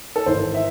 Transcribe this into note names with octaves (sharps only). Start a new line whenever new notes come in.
A4
G#1 G#2 E3 C5
E5